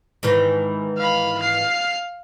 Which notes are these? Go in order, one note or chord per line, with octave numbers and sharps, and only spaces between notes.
G#2 D#3 E3
F5 B5
F5 C7